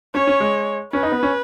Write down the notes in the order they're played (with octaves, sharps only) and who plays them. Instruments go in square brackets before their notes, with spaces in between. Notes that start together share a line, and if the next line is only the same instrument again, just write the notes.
[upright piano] C#4 [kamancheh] C#5
[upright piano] C#4
G#3
[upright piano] C#4 [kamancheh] B4
[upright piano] D#4
B3
C#4